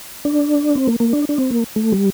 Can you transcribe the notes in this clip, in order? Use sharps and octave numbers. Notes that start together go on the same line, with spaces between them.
D4
C4
A#3
A#3
D4
D4
C4
A#3
A3
G3